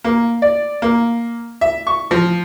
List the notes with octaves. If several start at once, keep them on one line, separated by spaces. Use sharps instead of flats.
A#3
D5
A#3
E5
C#6
F3